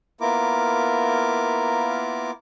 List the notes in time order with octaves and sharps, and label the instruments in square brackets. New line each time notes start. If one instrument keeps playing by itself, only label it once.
[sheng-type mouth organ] A#3 B3 E4 F4 A#4 D6